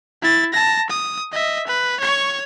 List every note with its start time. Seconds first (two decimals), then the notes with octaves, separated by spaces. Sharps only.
0.22 E4 A6
0.53 A5 A#6
0.90 D#6
1.32 D#5 E5
1.67 B4
2.00 C#5 C#6